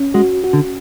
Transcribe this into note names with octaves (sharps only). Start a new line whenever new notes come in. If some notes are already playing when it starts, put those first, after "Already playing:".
Already playing: C#4
G#3 F#4
F#4
D3